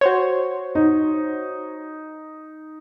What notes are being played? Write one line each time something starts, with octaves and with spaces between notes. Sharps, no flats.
F#4 C5 C#5
D#4